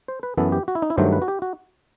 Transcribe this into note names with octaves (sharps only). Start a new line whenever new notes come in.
C5
B4
F#2 E3 B3 A4
G4
F#4
E4
D#4
E4
G2 D#3 F#3 A3 C5
B4
F#4
G4
F#4